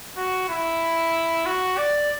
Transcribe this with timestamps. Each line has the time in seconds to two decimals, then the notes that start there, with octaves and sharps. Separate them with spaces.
0.17 F#4
0.49 E4
1.46 F#4
1.77 D5